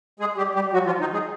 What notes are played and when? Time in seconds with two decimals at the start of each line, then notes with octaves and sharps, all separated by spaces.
0.20 G#3 G#4
0.37 G3 G4
0.55 G3 G4
0.74 F#3 F#4
0.86 F3 F4
1.00 D#3 D#4
1.13 G#3 G#4